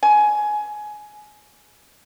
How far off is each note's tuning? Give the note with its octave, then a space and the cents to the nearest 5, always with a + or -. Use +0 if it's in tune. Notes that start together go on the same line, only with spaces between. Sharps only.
G#5 +15